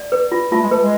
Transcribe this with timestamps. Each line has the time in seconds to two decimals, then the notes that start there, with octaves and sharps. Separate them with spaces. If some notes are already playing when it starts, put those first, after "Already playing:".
Already playing: D5
0.12 B4
0.32 F4
0.52 A3 F4
0.62 G#3
0.71 A3 B4
0.82 G#3